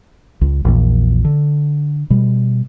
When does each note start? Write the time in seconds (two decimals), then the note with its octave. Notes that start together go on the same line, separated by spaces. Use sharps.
0.41 C#2
0.65 A#1 E2 A#2
1.25 D3
2.10 B2 G3